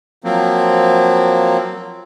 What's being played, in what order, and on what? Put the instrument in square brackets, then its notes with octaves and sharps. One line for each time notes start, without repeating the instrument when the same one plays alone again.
[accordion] F3 F#3 A#3 C4